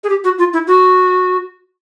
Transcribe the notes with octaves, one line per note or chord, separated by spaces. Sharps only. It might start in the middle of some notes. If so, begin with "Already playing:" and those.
G#4
G4
F#4
F4
E4
F#4